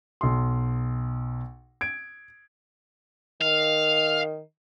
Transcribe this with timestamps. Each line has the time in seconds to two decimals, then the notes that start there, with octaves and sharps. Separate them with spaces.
0.21 B1 C6
1.81 G#6 D7
3.42 D#3 F5